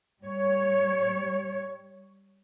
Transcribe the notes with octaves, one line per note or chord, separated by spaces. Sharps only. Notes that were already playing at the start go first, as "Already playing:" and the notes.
G3 C#5